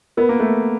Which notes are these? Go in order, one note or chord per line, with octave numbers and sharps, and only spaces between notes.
B3 F4 A#4 D#5
A#3
A3 B3